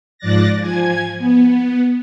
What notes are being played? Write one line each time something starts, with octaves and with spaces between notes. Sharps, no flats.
G#2 F3 D5 F#6 A6 A#6
F3 G#5 G#6
B3